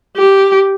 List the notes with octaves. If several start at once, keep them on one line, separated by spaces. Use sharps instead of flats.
G4